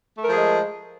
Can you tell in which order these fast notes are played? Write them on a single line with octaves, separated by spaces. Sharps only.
A3 A#4 F3 G#4 G#3